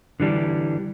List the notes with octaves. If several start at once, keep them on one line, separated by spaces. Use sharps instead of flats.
D3 E3 G3 D4